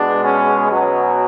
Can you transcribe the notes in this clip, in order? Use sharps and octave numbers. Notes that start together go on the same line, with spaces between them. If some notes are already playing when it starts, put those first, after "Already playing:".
Already playing: B2 G#3 B3 D4
C#4
B2 F#3 B3 C#4